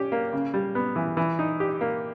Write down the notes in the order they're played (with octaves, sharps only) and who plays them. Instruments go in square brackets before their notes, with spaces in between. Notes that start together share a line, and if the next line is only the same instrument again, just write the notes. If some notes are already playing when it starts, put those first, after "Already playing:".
Already playing: [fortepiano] C#4 G4
A#3
C#3
G3
B3
E3
E3
D#4
G4
A#3